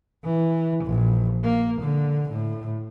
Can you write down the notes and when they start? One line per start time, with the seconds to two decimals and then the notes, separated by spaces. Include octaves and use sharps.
0.24 E3
0.85 A#1
1.43 A#3
1.81 D3
2.30 A2